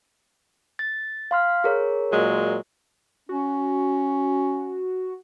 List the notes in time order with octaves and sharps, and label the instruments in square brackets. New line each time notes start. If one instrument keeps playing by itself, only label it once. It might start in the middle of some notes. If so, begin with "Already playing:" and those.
[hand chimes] A6
F5 C6 F6
G#4 A#4 C#5
[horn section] A#2 F#3 G#3
[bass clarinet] C#4 [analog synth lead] F#4